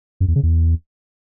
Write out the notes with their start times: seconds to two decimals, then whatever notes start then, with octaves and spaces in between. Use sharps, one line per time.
0.20 F#2
0.28 E2
0.36 C#3
0.43 E2